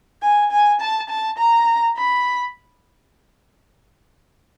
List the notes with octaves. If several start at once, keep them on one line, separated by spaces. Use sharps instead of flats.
G#5
G#5
A5
A5
A#5
B5